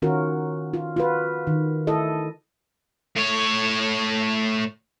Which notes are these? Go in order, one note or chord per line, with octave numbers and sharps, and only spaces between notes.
D#3 C#4 F4 F#4 A#4
F4
F4 F#4 B4
D#3
E4 A4 D#5
A2 C#5